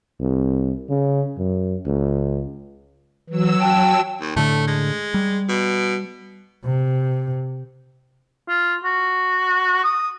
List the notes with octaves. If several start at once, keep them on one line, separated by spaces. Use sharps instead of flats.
C2
C#3
F#2
C#2
E3 F#3 E6
G5 A5
D#2
A2 D3 A3
G#3
G3
B2
C3
F4
F#4
D#6